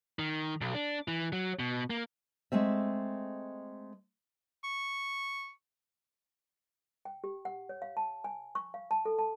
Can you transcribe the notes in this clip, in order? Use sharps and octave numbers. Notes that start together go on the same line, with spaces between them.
D#3
B1
D4
E3
F#3
B2
A#3
G#3 A3 C4 E5
C#6
G5
G4
F#5
C#5
F5
A5
G#5
C#6
F5
A5
A4
A5